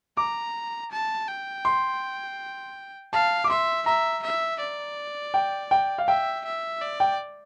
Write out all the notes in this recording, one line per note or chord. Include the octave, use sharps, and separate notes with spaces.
A#5 D6
A5
G5
C6
F5 A5
D6
E5 C6
E5 A#5
E5
D5
G5
G5
F5
E5 G5
E5
D5
G5